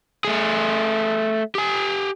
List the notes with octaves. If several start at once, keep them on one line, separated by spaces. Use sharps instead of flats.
A3 G#4
G4 G#5